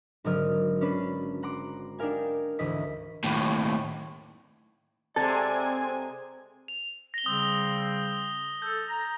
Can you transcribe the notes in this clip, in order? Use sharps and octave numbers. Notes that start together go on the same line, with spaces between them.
G#1 D3 F#3 A#4 D#5 F6
C#4 D4 B4
F#5 A#5 C6 D6
D4 D#4 G4 A#4 F5 G#5
G#1 D2 E3 E4 D#5 B6
D#2 A2
C3 G#3 C4 A4 D5 G#5 G#6
F7
A#6 G7
C#3 G3 C4 D#6
A4 G6
A#5